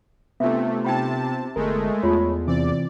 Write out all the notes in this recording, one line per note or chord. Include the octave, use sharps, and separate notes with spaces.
C3 A3 B3 D4 F4 E5
C3 D#4 G5 A5 B5
G1 G#3 A3 A#4
E2 F4 C#5 B5
C3 E3 C4 D5